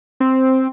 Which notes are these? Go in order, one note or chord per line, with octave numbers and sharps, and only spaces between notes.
C4